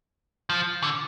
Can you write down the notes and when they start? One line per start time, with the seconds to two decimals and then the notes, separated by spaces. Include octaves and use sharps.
0.50 F3
0.83 D3